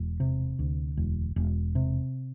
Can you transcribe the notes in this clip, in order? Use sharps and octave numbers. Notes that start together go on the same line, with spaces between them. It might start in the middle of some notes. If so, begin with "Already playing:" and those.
Already playing: E1
C3
D2
E1
E1
C3